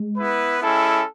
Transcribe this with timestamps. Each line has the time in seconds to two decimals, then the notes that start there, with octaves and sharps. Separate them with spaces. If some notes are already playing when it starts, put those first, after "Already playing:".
Already playing: G#3
0.17 B3 E4 B4
0.62 G#3 C#4 E4 A4